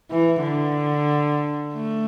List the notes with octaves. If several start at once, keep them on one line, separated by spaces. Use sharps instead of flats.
E3
D3
A3